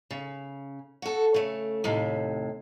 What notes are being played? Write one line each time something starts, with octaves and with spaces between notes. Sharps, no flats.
C#3
F#4 A4
C#3 A3
D#2 A2 C3